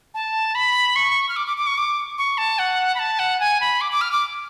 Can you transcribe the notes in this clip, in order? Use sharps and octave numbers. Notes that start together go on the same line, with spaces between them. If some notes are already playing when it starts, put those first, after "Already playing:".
A5
B5
C#6
F6
D6
D6
D6
C#6
D6
C#6
A5
F#5
B5
A5
F#5
G#5
B5
D6
D6
F6
D6